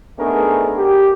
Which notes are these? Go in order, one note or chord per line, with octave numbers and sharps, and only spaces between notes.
A3 B3 D4 D#4 G#4 A#4
G4